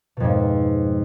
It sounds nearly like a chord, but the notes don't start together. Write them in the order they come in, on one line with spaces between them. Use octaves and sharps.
B2 F2 G#2